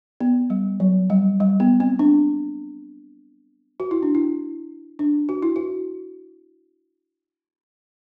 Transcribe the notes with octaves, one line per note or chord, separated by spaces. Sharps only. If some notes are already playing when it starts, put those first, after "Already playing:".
B3
G3
F#3
G3
G3
B3
C4
D4
F#4
E4
D4
E4
D4
F#4
E4
F#4